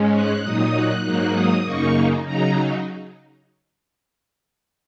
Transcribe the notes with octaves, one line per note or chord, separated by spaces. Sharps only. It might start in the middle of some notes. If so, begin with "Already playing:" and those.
Already playing: G#2 G#3 C#4
F#6
A#2 F#3 D#4 D#6
F#6
G#2 F#3 A#3 D#4
D#6
F#2 C#3 A#3 D#4 C#6
C#3 F#3 D#4 A#5